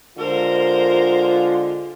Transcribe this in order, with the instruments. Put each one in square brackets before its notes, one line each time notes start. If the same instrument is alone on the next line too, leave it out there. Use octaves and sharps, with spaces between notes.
[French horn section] D3 G#3 F4 [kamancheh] A#4 C5